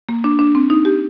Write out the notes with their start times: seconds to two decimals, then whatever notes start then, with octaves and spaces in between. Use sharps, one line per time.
0.09 A#3
0.24 D4
0.39 D4
0.55 C4
0.70 D#4
0.85 G4